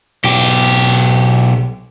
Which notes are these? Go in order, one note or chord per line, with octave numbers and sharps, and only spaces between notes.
B1 G4